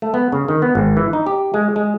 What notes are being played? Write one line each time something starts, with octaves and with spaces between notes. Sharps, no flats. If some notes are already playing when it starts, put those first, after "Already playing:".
A3
B3
C#3
D#3
B3
G#1
E3
D#4
G4
G#3
G#3